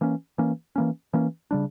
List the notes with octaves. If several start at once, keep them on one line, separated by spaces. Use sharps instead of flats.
E3 A#3 C#4
E3 A#3 C#4
E3 A#3 C#4
E3 A#3 C#4
C#3 G3 D4